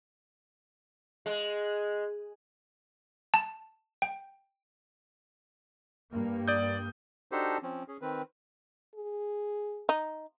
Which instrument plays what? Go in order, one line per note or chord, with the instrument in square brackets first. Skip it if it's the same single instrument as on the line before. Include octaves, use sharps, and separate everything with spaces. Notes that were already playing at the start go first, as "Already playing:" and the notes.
[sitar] G#3
[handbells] A5
G5
[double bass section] G2 A#3
[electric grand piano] D5 D#6 G6
[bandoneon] D4 D#4 F#4 G4 A4 C5
F3 C4 C#4
C#4 G#4
D#3 C4 B4
[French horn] G#4
[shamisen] D#4